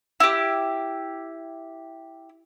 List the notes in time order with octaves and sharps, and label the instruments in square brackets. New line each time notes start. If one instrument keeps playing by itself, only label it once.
[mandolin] E4 G4